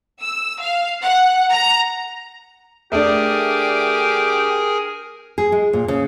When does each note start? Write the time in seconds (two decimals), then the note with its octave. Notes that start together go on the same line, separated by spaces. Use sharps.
0.21 E6
0.61 F5
1.03 F#5
1.52 A#5
2.92 A3 D4 G4 G#4 A#4 G#5
5.38 G#4
5.52 G#3
5.73 A#2
5.88 C#3